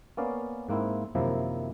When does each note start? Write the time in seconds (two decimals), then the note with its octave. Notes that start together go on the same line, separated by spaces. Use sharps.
0.17 A#3 B3 C#4 D5 F5
0.69 G#2 A#3 C4 E4
1.15 F#2 C3 D#3 F3 A#3 E4